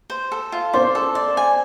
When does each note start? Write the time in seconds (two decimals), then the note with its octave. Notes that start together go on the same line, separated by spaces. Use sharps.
0.10 C5
0.32 A4
0.52 F4
0.73 C5 D5 C6
0.95 A4
1.15 D5
1.37 G#5